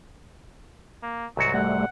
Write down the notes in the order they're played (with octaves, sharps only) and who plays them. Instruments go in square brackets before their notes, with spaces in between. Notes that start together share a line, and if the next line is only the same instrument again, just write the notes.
[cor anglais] A#3
[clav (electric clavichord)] C2 G#2 F#4 [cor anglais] F#3
[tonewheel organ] G3 A3 [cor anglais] F#5